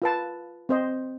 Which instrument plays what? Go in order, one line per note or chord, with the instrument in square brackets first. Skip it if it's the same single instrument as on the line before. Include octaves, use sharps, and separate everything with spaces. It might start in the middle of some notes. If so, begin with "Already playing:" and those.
[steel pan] F4 B4 A5
C4 C5 D#5